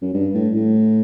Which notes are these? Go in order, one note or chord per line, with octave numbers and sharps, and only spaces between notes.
F#2
G2
A2
A2